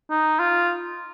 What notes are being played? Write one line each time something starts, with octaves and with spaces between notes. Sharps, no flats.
D#4
F4